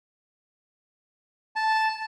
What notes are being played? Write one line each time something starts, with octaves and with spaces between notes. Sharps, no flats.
A5